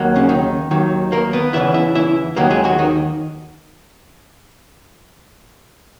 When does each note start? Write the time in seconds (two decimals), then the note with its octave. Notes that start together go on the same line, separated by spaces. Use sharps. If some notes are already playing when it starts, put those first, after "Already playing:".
Already playing: D#2 F#3 A#3
0.16 C#3 C#4
0.29 D#3 D#4
0.71 D#2 D#3 F#3
1.12 A#3 A#4
1.33 B3 B4
1.53 E2 C#3 E3 E4 E5
1.74 E4 E5
1.95 E4 E5
2.36 D#2 D#3 F#3 A#3 A#4
2.51 G#3 G#4
2.64 F#3 F#4
2.79 D#3 D#4